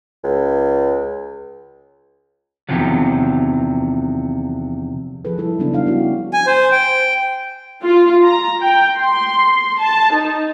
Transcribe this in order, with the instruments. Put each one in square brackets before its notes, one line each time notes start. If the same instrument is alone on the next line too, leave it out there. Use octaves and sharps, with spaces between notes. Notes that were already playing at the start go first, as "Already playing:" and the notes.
[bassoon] C#2
[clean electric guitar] E2 G2 C3 D#3 F3 F#3
[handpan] F3 G#4 A4 B4
G3 E4 A4
C#3 F#3 B3 D4 D#4
G3 D4 E4 F5
B3 C#4 E4 F#4 G4
[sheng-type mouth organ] G#5
C5
G5
[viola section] F4
A#5
G5
C6
A5
D#4